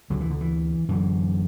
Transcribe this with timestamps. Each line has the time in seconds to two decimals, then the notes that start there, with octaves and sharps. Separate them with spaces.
0.10 D2 D3 F#3
0.21 E3
0.30 D3
0.41 E3
0.89 F#2 D3 E3